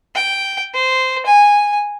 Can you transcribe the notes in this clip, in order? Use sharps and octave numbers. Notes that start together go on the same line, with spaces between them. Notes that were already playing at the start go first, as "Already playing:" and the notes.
G5
C5
G#5